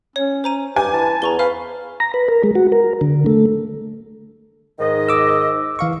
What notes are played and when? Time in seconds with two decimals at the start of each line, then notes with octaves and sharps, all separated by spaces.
0.16 C#4 C#5
0.44 C5 A#5 D#7
0.76 G2 G4 G#5
0.93 E3 A5
1.22 E2 A#5 C#6 G7
1.39 B4 C5 F5 F6
2.00 A#5
2.14 B4
2.29 A#4
2.43 G#3
2.55 F#4
2.72 A#4
3.01 D3
3.26 A3
4.80 G#2 D#3 D#5
5.09 D6 E6
5.79 E3 F5 C#6